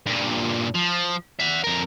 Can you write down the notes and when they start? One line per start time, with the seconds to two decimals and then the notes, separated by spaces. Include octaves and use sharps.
0.06 G2 A#2
0.74 F3
1.40 E5 F#5
1.64 F2 A#4